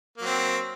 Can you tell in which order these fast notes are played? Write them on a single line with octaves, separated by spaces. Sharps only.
A#3 F#3 C4